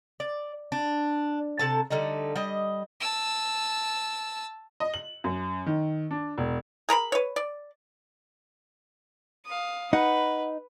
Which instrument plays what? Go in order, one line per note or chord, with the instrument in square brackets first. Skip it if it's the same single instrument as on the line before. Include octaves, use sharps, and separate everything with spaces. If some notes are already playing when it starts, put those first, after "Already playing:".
[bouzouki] D5
D4
C3 A4 A5
D3 G3 A3 D#4
G3 D#5
[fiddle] A5 E6
[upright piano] D#5
F#7
F#2
D#3
D4
E1
[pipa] G#4 A#4 A#5 B5
B4 C#5
D5
[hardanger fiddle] F5 D#6
[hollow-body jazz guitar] D#4 [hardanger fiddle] B4 [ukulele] F#5